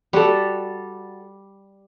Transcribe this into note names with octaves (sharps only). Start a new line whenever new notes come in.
G3 F#4 A4